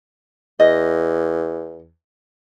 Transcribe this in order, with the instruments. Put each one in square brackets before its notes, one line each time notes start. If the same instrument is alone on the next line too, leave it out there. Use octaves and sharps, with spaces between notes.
[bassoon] E2 [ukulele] D#5